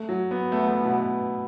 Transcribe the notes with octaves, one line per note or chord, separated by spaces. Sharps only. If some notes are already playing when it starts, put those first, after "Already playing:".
Already playing: A3
F#3
B3
A3 B3
A3
B2